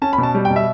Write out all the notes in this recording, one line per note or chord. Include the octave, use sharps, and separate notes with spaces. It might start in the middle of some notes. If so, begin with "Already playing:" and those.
C#4 A5
B5
B2
A5
G3
G5
B2
E5